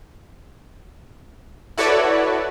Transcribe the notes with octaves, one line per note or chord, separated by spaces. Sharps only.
E4 F#4 A4 B4 C#5 D5